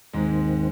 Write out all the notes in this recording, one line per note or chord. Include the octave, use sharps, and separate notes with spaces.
D#2 G#2 D#3 G#3 C4